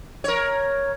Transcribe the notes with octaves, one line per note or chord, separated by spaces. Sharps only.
A#4 C#5